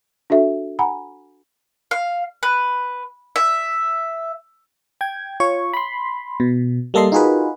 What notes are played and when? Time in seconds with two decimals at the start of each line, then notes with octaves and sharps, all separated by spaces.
0.30 D4 F#4 A4 E5
0.79 F#5 G#5 A#5 B5
1.91 F5
2.43 B4
3.36 E5
5.01 G5 G#6
5.40 F4 C#5 C#6
5.73 B5 C6
6.40 B2
6.94 G3 A#3 A4 D#5 C6 C7
7.12 D#4 F4 F#4 G#4 A#4 B4